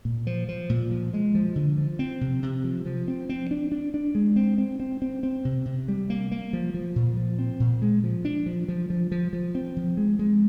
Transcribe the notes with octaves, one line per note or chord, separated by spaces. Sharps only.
A#2
F3
F3
A#2
F3
G#3
F3
D3
F3
C4
C3
C3
F3
F3
C4
C4
D4
D4
D4
G#3
C4
C4
C4
C4
C4
C3
C3
G3
A#3
A#3
F3
F3
A#2
F3
C4
A#2
G#3
F3
D4
F3
F3
F3
F3
F3
C4
F3
G#3
G#3